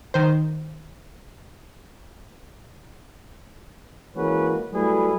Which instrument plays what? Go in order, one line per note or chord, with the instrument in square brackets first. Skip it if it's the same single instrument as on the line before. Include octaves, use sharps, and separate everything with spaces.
[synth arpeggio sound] D#3 C5
[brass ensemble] E3 G#3 A#3 C#4 F#4 B4
F#3 G3 A3 E4 G#4 B4